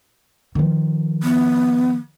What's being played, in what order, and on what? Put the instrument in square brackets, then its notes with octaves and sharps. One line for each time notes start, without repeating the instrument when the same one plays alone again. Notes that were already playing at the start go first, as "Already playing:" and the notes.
[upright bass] D#3 F3
[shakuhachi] B3